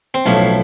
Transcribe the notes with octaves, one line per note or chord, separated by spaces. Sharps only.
C4
B1 A2 F3 C#4